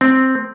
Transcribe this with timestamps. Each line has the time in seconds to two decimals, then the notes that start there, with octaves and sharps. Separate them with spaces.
0.01 C4